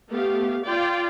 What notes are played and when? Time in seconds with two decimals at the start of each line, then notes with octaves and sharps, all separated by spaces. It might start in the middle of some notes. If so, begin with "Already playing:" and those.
0.11 A3 B3 G4 F5
0.64 F4 D5 G5